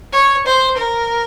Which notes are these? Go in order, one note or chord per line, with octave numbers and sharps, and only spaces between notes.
C#5
C5
A#4